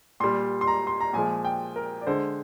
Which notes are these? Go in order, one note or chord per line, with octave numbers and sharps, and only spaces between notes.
A#2 G3 C6
C6
A#5
C6
A#5
A#2 F3 G#3 G#5
G5
A#4
D5
D3 G#3 C5